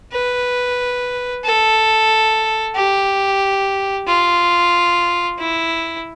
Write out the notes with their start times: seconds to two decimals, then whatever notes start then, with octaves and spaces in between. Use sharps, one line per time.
0.12 B4
1.44 A4
2.76 G4
4.07 F4
5.39 E4